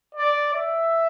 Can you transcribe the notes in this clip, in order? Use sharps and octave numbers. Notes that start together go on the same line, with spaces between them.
D5
E5